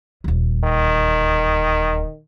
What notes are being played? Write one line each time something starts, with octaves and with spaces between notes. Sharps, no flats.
D#1 D2
D#3